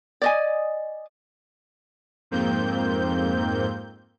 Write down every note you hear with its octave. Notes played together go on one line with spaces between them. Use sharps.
D5 D#5 G#5
F2 G#2 A#3 C4 G6